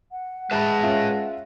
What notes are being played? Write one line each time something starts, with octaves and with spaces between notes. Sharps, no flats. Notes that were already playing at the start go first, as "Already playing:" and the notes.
F#5
G#3 B4 E5 A5 B5
C#4 F4 E5